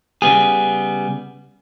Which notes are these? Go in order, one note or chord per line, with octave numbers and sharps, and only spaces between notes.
C#3 G3 B3 G#4